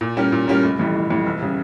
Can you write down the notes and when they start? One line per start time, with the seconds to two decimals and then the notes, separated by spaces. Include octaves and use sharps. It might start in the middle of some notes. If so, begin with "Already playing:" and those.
0.01 A#2
0.17 G3 C#4 G4 A#4
0.32 A#2
0.48 G3 C#4 G4 A#4
0.63 F1
0.79 F2 E3 G3
0.94 F1
1.10 F2 E3 G3
1.26 E1
1.41 C#3 G3